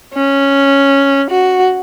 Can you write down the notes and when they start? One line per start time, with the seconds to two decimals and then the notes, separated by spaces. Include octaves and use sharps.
0.14 C#4
1.30 F#4